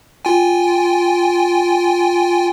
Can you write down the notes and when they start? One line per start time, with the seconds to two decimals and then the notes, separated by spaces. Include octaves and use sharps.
0.25 F4 G5 G#5